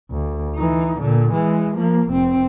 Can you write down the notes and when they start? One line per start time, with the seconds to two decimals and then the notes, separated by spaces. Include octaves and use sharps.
0.11 D2
0.55 E3 D#4
1.00 A#2 D3
1.32 E3 G#3
1.76 F3 A#3
2.10 F1 C4